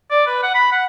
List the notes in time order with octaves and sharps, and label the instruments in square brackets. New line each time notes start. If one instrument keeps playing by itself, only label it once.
[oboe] D5
B4
F#5
B5
F#5